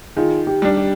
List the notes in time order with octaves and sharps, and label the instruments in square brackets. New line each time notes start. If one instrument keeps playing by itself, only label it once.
[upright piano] D#3 [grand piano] F4 G#4
[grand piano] G4
[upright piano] G3 D4
[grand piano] G4